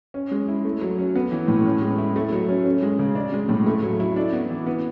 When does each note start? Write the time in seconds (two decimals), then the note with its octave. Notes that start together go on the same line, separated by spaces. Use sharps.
0.14 C#4
0.31 G#3
0.48 E4
0.65 A3
0.81 F#3
0.98 C#4
1.15 B3
1.32 E3
1.48 A2
1.65 C#4
1.82 G#3
1.98 E4
2.16 A3
2.32 F#3
2.49 C#4
2.66 C#4
2.83 G#3
2.99 C#3
3.15 D4
3.33 G#3
3.49 A2
3.66 A3
3.83 F#3
4.00 E4
4.16 D4
4.33 B3
4.50 E3
4.66 B3